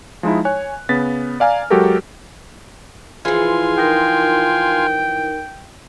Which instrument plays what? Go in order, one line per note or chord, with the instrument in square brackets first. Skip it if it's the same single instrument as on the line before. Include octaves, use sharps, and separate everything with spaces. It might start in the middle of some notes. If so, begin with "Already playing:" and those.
[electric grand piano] F3 G#3 D#4 E4
C#5 G#5 F#6
C#3 B3 A6 B6
D5 F5 G#5 A#5 F6
F#3 G#3 F#4 G4 A4 A#4
[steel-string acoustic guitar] E3 F3 [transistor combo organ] F4 G#5 C6 [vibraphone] G#4
[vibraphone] D#4 A#4 [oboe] G5